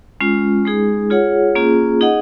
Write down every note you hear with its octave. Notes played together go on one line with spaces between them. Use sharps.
G#3 C#4 F4
G#3 D#4 G#4
F4 G#4 C#5 F#5
A#3 C#4 F4 G#4
D#4 G#4 D#5 F#5